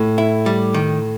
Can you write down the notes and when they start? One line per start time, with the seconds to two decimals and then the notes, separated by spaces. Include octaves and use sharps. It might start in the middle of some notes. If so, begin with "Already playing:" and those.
Already playing: A2
0.18 E4
0.46 G3
0.74 D#3